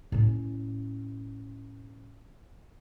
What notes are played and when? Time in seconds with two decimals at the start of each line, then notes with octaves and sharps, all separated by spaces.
0.12 A2 C#4